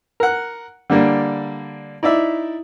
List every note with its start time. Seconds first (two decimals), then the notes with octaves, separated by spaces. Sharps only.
0.20 A#4 F#5
0.90 D3 G3 A#3 D4
2.03 D#4 E4 D5 E5